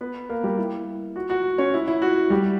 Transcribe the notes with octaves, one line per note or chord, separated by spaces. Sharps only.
B3 B4
A#3 A#4
G3 G4
E4
F#4
F#4
C#4 C#5
E4
E4
F#4
G3 G4